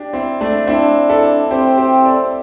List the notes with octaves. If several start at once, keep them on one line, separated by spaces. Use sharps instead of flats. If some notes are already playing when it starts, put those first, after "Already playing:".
Already playing: D4 G4
C4 E4
A3 D4
C4 D4 E4
E4 A4
C4 G4 C5
G4 C5
A4 D5